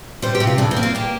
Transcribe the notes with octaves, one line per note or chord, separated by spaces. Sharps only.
G3 C5
G4
C3
F4
F2 D4
C4
A#3
F4
A#3 G4